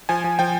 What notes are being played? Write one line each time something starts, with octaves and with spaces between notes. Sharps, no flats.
F3 G#5
F3
F3 G5